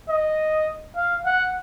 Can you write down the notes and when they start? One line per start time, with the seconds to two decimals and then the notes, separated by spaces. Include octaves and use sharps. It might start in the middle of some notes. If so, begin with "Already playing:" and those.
0.09 D#5
0.96 F5
1.25 F#5